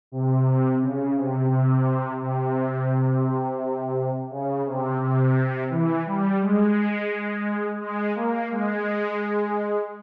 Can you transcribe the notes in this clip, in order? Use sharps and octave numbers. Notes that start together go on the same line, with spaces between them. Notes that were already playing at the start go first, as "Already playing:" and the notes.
C3
C#3
C3
C3
C3
C#3
C3
C3
E3
G3
G#3
G#3
A#3
G#3